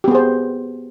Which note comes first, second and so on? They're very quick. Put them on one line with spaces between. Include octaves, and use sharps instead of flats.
G4 B3 G#4 C5